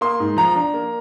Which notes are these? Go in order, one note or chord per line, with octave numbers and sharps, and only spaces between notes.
A#3 C6
G#2
F3 A#5
D4
A#3